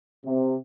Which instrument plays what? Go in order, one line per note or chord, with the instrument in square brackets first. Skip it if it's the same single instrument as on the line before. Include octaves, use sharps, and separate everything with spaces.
[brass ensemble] C3